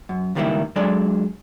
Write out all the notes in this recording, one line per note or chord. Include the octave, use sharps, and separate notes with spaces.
F#2
C#2 A2 D#3 G3 A#3 E4
F#3 G#3 D4 A4 D5